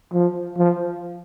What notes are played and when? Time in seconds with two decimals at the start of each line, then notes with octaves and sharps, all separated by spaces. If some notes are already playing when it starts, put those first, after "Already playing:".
0.13 F3
0.58 F3